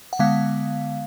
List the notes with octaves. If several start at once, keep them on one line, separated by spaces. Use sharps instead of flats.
F#5
D3 G#3 B3 F5